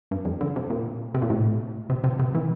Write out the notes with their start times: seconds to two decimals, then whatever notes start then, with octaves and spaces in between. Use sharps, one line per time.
0.11 G2
0.25 F2
0.41 D3
0.56 C3
0.70 A#2
1.14 C3
1.22 A#2
1.30 A2
1.90 C3
2.04 C3
2.19 C3
2.35 E3